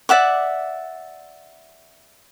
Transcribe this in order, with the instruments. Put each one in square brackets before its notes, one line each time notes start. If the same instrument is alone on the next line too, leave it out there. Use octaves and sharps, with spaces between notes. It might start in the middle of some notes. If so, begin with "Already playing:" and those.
[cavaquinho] D5 E5 F#5 D6